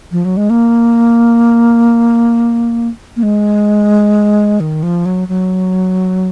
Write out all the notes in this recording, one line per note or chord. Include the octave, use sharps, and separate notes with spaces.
F3
F#3
G#3
A#3
A#3
G#3
D#3
F3
F#3
F#3